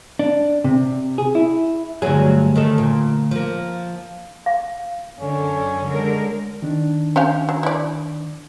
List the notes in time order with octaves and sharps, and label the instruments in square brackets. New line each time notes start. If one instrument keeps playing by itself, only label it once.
[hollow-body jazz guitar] D4
C3
G#4
E4
[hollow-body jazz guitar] D2 G#4 [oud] G2 F#3
[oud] D#3 A3 A4
A#2
F3 A#3
[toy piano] F5
[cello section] F#2 D3 [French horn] C#4
[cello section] D3 G#3 A#4
[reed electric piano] D#3 D4
[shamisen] C#4 G4 F5
F#3
E4 D5